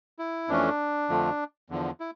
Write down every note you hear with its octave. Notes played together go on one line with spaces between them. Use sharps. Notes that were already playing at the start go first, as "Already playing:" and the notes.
E4
F2 E3 A3 C#4 D4
F2 D3 F3 A3
E2 D3 F3
E4